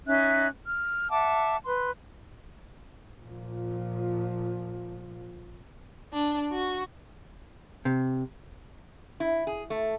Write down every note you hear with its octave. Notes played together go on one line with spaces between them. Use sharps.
C#4 D#4 E5 F#6
F6
E5 F#5 A5 D6
B4 C6
A#2 F3
D4
F#4
C3
E4
G#4
A3